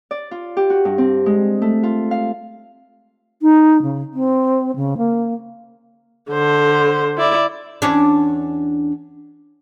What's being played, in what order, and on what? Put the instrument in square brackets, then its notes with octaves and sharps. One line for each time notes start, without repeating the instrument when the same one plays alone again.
[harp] D5
F4
G4
F#4
G2
C4
G#3
A3
F4
F5
[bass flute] D#4
C#3
C4
C#3
A#3
[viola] D3 C5
E4 D5
[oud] E2 C#4 D4